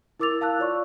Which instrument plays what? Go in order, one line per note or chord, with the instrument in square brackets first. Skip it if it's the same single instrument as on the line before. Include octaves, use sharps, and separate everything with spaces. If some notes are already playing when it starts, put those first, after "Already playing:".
[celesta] E4 A#4 D6 E6 A6 F7
F5 A5 E6 F#6
F4 C#5 D5 C#6